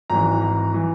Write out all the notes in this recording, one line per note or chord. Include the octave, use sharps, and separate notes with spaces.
G#1 G#2 E3 A#5
A#5
E3